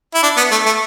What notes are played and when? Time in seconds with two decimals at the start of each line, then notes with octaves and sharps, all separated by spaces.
0.15 E4
0.23 D4
0.37 B3
0.51 A3
0.66 A3